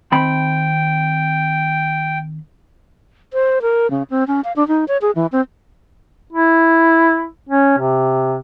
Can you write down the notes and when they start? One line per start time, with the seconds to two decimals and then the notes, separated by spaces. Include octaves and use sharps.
0.12 D#3 C4 G5 B5
3.33 C5
3.62 A#4
3.91 C#3
4.10 C4
4.27 C#4
4.44 F5
4.56 D4
4.68 D#4
4.88 C#5
5.02 G#4
5.15 E3
5.32 C4
6.33 E4
7.49 C#4
7.78 C3